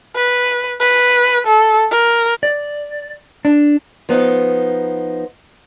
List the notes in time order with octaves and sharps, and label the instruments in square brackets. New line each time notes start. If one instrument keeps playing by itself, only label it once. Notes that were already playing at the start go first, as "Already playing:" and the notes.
[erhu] B4
B4
A4
A#4
[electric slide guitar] D5
D4
[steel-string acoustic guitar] F3 B3 D#4